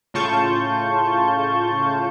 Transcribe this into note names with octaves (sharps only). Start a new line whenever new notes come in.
A2 C#3 F4 A5 C#6 G6